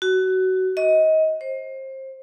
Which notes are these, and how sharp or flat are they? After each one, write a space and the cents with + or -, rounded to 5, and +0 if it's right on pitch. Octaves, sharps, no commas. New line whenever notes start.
F#4 +20
D#5 +25
C5 +25